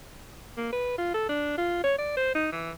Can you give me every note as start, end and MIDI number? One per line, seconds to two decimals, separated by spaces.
0.57 0.72 58
0.72 0.98 71
0.98 1.13 65
1.14 1.28 69
1.29 1.53 62
1.58 1.79 65
1.84 1.96 73
1.98 2.15 74
2.17 2.35 72
2.35 2.48 63
2.52 2.72 52